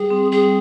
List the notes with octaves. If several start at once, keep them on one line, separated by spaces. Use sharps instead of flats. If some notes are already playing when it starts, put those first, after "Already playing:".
Already playing: G3 G#4
C4
G3 G#4